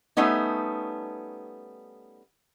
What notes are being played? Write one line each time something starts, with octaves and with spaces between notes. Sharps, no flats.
G3 A3 B3 C#4 D#4